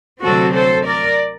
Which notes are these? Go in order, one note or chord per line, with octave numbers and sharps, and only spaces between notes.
D2 C3 F#3 C4 F#4 A4
A4 C5
A#4 D5